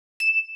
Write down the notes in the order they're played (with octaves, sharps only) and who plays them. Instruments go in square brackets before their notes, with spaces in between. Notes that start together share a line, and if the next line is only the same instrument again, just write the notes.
[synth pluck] E7